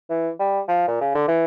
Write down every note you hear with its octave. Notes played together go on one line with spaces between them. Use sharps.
E3
G3
F3
A#2
C#3
D3
E3